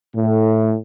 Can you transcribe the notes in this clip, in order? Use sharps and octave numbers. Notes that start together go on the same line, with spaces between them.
A2